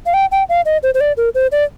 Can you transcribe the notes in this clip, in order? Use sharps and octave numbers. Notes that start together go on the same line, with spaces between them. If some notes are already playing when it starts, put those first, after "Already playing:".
F5
G5
G5
F5
D#5
C5
C5
D5
A#4
C5
D5